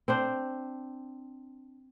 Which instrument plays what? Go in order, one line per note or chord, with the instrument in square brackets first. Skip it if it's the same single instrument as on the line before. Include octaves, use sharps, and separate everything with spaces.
[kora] C4 D4 C5